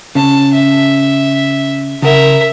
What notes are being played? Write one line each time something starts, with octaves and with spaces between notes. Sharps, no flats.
C#3 C#4 A5
E5
C#3 A#4 E5 F#5